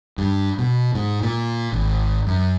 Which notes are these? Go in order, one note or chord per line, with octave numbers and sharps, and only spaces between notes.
G2
B2
G#2
A#2
G#1
F#2